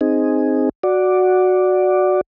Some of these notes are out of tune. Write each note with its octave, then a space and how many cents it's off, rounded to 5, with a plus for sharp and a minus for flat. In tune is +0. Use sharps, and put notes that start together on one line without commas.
C4 +0 D#4 +0 G#4 +0
F#4 -5 D5 +0